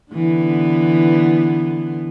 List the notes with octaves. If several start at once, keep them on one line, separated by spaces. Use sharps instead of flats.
D3 E3 B3